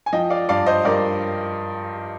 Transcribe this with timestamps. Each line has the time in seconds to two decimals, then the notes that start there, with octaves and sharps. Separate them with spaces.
0.06 G#5
0.12 F3 D#5 G5
0.30 D5 F5
0.49 G2 D5 F5
0.66 C5 D#5
0.85 G2 A#4 D5